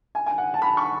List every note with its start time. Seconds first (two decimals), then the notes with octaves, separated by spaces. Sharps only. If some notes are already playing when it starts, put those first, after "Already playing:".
0.15 G#5
0.26 G#5
0.38 F#5
0.54 A5
0.62 B5
0.77 C#6